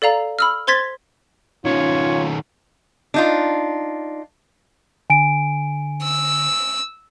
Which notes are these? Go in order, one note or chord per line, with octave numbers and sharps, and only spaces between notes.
A4 D5 F5 A#5
B5 E6 F6
C5 C6 G#6 A6 B6
D#3 C#4 F4 C#5
D4 D#4 F4
D3 G#5 D7
E6